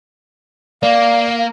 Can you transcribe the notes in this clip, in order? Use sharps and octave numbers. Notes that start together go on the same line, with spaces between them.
A#3 D5 F5